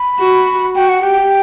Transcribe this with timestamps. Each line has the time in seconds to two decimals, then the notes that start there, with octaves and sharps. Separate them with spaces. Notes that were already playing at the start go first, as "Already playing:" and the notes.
Already playing: B5
0.19 F#4
0.75 F#4 G5
0.89 F#5
1.03 G4 G5